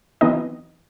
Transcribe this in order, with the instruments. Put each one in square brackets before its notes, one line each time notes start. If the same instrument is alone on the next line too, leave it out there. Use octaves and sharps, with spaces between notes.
[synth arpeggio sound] E3 F#3 B3 C4 D#4 D#5